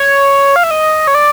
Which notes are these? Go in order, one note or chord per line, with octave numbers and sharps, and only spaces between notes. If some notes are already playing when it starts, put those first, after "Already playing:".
Already playing: C#5
F5
E5
D#5
C#5
D5